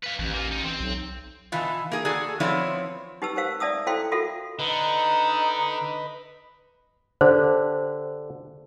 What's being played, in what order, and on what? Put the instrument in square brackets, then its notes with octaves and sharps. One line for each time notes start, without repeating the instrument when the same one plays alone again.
[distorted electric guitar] B4 F5
[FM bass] A1 [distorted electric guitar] D#2
[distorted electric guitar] A#3 F4
D3 D#4
C4
[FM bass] B1
[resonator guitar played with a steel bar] B2 E3 E4 F4
A#3 G#4
F#4 G#4 A4 D5
F3 B3 C4 E4 C#5 D5
[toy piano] D#4 G4 B4 A5 E6
A#4 C5 F5 E6
D5 E5 A5 D#6 E6
E4 A4 C5 F5 G5 C6
F4 F#4 A4 A#4 E5
[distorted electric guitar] D3 [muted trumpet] D#4 [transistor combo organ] B4 D#5 B5
[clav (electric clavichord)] D3 G4 [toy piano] C5